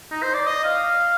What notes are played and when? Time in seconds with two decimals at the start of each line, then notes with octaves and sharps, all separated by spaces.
0.11 D#4
0.23 C5
0.34 D5
0.47 D#5
0.64 F5